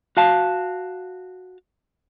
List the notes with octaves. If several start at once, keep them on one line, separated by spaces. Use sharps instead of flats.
F#4 F5 A5